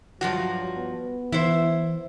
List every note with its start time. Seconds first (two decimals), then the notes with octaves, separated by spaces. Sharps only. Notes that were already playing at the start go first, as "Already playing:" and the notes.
0.21 G2 F3 F#3 F#4
0.77 B3
1.32 E3 E4 C5